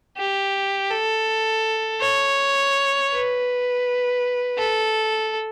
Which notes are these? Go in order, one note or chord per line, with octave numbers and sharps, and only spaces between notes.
G4
A4
C#5
B4
A4